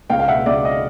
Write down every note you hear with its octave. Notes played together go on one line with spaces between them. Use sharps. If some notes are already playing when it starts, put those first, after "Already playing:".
C#2 F5 G5
F5
B2 E5 F#5
C#2 D5 E5
D#5